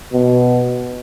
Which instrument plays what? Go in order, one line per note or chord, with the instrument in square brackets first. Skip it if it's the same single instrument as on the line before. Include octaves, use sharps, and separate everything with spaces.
[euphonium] B2